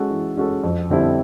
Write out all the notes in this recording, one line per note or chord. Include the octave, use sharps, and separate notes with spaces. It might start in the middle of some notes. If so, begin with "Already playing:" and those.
Already playing: G#3 C#4 F#4 A4
E3
G#3 C#4 F#4 A4
F2
D3 G3 C4 E4